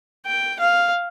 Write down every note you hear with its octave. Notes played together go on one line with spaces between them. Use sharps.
G5
F5